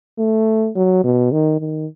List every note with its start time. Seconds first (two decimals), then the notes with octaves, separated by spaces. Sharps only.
0.18 A3
0.76 F#3
1.04 B2
1.32 D#3
1.61 D#3